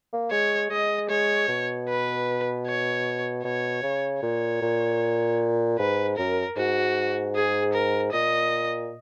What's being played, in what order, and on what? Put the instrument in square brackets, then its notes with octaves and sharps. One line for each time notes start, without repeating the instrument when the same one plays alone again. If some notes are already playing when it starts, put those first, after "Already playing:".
[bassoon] A#3
[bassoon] G#3 [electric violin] C#5
[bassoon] G#3 [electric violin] D#5
[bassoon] G#3 [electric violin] C#5
[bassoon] B2
[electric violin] B4
C#5
[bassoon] B2 [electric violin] C#5
[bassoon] C#3
[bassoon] A#2 [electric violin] C#5
[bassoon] A#2
[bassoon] G#2 [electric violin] B4
[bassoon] F#2 [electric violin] A#4
[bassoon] G#2 [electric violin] F#4
[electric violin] G#4
A#4
[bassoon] A#2 [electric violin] D#5